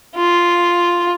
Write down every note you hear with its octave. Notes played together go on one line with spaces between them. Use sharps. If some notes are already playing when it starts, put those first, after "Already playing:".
F4